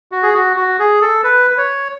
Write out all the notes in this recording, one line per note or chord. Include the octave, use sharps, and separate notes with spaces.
F#4
G#4
F#4
F#4
G#4
A4
B4
B4
C#5